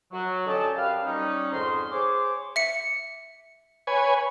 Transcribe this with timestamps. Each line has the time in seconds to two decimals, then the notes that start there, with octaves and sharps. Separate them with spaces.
0.12 F#3
0.47 D3 C#4 G4 D#5 A5
0.76 F#2 G4 B4 F5
1.04 G3 C#4 D#4
1.51 F2 G#2 D#3 C6
1.91 G#4 C5 C#5 D6
2.56 E5 C#7
3.87 B4 C#5 G#5